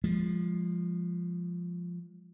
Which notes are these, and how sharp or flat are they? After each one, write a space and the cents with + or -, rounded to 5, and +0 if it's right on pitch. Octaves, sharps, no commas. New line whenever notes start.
F3 +0 G#3 -25